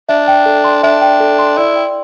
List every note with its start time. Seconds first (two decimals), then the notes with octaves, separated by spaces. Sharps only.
0.09 D4 E5
0.28 G5
0.46 A4
0.64 C6
0.83 D4 E5
1.01 G5
1.20 A4
1.39 C6
1.57 E4 D5
1.76 G5